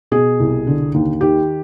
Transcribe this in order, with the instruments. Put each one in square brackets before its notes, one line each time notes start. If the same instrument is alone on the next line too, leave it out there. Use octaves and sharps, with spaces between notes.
[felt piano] B2 G#4
C2
D3
D#2
D#3 G4